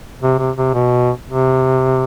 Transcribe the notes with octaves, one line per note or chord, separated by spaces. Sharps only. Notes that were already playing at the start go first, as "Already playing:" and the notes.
C3
C3
C3
B2
C3